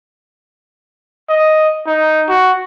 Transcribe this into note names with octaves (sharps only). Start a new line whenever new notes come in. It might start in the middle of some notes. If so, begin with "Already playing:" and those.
D#5
D#4
F#4